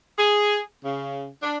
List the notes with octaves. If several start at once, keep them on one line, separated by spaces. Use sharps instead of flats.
G#4
C#3
D4